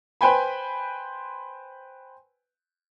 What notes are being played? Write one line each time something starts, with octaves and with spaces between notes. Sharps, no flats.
B4 C5 G5 G#5 B5